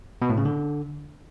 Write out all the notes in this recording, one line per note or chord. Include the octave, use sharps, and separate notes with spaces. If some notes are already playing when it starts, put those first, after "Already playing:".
B2
A2
C#3
D3